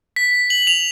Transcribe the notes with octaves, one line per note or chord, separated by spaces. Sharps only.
B6
F#7
F7